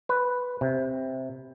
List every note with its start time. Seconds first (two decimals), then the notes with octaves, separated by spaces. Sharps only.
0.09 B4
0.61 C3